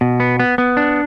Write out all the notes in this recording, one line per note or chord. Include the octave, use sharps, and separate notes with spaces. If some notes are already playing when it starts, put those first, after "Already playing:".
B2
B3
B3
B3
D4